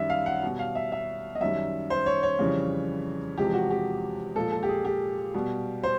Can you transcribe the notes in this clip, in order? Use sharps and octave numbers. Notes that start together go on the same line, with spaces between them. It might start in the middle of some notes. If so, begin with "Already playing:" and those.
Already playing: F#2 D#3 G3 E5
F5
F#5
B2 G3
F5
E5
E5
D#5
F#2 D#3 G3 E5
C5
C#5
C#5
F2 C#3 E3 G3
E2 C3 F3 G#3 G4
F#4
G4
A#2 F3 G#3 A4
A4
G4
G#4
G4
B2 G3
C5